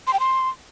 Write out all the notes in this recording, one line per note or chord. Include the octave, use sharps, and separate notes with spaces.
C6
G5
C6